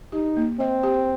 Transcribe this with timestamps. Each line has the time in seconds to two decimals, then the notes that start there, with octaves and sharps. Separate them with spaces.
0.12 D#4 G4
0.37 A#3
0.60 C4 D#5
0.83 G4